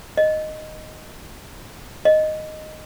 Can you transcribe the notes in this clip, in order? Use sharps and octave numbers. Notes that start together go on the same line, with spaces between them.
D#5
D#5